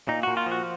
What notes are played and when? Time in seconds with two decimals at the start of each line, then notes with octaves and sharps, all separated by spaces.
0.08 A#2 D#4
0.23 A#2 F#4
0.37 F4
0.47 F3 F#4